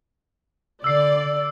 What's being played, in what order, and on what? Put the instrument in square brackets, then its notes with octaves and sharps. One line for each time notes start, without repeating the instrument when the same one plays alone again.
[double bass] D3 [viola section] D5 [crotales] E6 C7